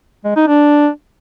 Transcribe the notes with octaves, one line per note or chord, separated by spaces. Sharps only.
G#3
D#4
D4